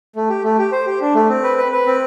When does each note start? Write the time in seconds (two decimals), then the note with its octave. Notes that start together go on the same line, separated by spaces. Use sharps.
0.16 A3
0.29 G4
0.44 A3
0.58 G4
0.72 C5
0.86 G4
1.01 D4
1.15 A3
1.29 C4
1.43 B4
1.57 B4
1.72 B4
1.86 C4